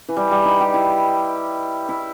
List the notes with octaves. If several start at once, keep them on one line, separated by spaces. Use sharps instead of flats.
E3
G3
G3
D#4
G4
E4
E4